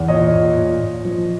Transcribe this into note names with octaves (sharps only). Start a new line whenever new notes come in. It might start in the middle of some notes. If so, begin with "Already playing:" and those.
Already playing: E2
A#2 C#5 D#5
A#2
A#2
A#2
F3